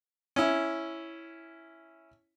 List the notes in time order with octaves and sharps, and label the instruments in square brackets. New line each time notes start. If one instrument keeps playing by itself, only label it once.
[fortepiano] C#4 E4